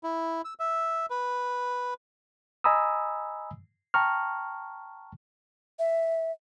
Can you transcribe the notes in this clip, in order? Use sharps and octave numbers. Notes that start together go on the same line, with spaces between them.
E4
E6
E5
B4
D#5 G#5 A#5 B5 D#6 E6
G5 A5 A#5 C#6 F6
E5